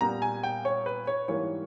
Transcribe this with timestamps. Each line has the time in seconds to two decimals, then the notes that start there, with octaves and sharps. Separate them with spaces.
0.01 A#2 G3 B3 A#5
0.22 G#5
0.43 G5
0.65 C#5
0.86 B4
1.07 C#5
1.28 G#2 E3 G3 A#3 C#5